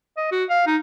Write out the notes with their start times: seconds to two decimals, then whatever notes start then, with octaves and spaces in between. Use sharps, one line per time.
0.17 D#5
0.32 F#4
0.49 F5
0.66 D#4